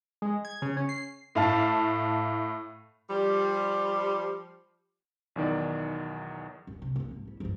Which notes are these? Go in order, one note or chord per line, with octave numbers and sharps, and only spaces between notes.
G#3
G#6
C#3
C#4
C7
A2 F5 A5
F3 G3
B1 E2 D#3 D5
D#1 F2
C3
D#1 A#3
G#1
E4
G2 F3